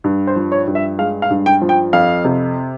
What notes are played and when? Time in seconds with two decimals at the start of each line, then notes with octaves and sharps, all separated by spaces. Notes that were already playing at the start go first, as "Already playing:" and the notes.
0.04 G2
0.27 C5
0.36 F3
0.52 C#5
0.67 G2
0.75 E5
0.98 G#3 F5
1.22 F5
1.30 G2
1.46 G5
1.61 F3
1.69 G5
1.93 F2 F5
2.24 C3